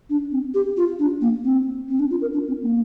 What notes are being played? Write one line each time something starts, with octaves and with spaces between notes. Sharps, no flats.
D4
C4
G4
F4
D4
A#3
C4
C4
D4
F4
A#4
D4
C4
A#3